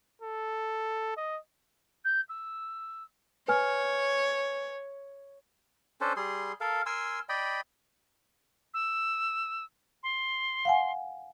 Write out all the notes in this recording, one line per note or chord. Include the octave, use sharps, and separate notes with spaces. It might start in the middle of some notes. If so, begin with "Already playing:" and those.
A4
D#5
G6
E6
B4 C#5 G#5 F6
C#4 D4 A4 C5
G3 G#4 C6
A4 A#4 F5
A#4 G#5 C6 E6
D5 D#5 G5 B5
E6
C6
F5 F#5 G#5